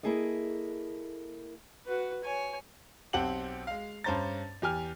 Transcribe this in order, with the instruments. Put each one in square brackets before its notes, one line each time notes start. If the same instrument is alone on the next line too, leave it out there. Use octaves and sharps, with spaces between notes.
[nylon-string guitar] A#3 E4 G#4 A4 D#5
[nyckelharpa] F#4 B4
C#5 G#5
[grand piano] B1 C4 G4 F#5 A5 F#7
G#3 F5
G2 C#4 C5 A#5 A6
E2 G4 G#5 F6